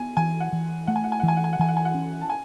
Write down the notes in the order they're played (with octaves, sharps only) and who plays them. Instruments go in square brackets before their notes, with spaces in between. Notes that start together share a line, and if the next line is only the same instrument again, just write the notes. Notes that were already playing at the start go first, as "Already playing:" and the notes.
Already playing: [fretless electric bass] B3 [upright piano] G#5
[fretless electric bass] E3 [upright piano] G#5
[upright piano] F#5
[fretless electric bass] E3
[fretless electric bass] A3 [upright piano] F#5
[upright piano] G#5
F#5
G#5
F#5
[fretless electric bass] E3
[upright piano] G#5
F#5
G#5
F#5
[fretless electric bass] E3 [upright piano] G#5
[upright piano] F#5
G#5
F#5
[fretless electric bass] C#4
[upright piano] A5
G#5